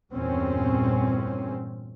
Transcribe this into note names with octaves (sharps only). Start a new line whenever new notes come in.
E2 G2 A#2 C4 C#4